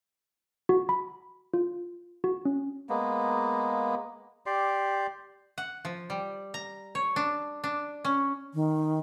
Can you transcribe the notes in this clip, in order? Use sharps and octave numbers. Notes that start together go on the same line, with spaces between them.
F#4
B5
F4
F#4
C#4
G#3 A#3 B3
G4 D5 C6
F#5
F3
G3
A#5
C#5
D4
D4
C#4
D#3